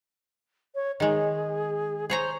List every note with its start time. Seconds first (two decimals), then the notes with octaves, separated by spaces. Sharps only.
0.75 C#5
1.00 D#3 G#3 G#4
2.10 G#4 C5 C#5 A#5